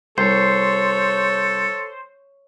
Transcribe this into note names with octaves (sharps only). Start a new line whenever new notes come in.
C2 A4 C5 C#5